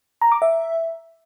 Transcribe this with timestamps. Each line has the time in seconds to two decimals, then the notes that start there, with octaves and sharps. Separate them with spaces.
0.21 A#5
0.32 D6
0.42 E5